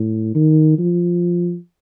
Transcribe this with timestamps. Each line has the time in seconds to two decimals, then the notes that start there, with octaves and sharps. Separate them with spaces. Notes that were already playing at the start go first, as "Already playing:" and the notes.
Already playing: A2
0.35 D#3
0.78 F3